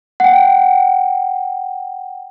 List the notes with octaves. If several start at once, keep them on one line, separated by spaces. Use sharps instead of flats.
F#5 G5